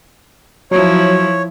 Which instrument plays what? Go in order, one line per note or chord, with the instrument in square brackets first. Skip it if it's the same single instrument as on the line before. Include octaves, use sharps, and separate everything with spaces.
[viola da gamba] F3 E4 [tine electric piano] F#3 [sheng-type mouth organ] C#5